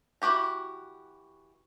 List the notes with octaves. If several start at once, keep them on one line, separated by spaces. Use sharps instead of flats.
E3 F#4 G4 A#5